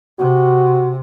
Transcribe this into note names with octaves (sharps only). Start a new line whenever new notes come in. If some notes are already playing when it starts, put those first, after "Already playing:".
C3 F#4